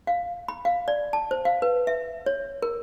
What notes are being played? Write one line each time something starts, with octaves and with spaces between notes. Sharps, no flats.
F5
B5
F5
D5
A5
C5
F5
B4
E5
C#5
A#4